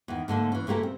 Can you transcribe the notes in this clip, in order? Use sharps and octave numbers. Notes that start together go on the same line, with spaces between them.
E2 D#3
G#2 D3 A3 A#3
E3 C#4
A#2 C#3 A3 G4 A#4
C4